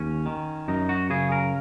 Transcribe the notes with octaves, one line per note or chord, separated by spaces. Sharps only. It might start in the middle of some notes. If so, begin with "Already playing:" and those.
Already playing: D#2 C#4
D#3
F#2 D#4
F#4
C#3 G#4
A#4